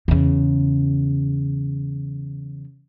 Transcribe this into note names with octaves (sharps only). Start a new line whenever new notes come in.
E2 C#3